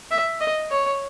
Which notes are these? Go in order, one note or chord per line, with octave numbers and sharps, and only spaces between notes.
E5
D#5
C#5